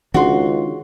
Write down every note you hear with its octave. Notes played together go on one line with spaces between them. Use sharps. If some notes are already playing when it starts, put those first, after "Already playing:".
C#2 D#3 C#4 D4 F#4 C6